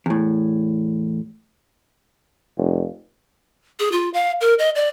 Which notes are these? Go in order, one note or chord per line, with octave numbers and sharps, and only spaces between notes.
E2 A2
F1
G#4
F4
F5
A#4
D#5
D5